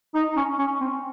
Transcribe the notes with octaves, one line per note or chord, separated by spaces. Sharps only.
D#4
C#4
C#4
C4